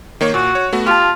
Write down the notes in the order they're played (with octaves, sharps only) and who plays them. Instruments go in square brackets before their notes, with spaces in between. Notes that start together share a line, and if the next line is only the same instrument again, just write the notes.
[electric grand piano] D#3 A#3 C#5
[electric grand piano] A#2 [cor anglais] F#4
[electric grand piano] C#5
A3 B3 F#4
[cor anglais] F4 [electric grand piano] G4 A5